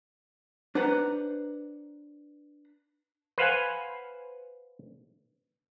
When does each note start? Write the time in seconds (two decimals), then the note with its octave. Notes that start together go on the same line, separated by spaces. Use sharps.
0.75 D4 B4 C5 F#5 A#5
3.38 B4 C5 F5 F#5 G#5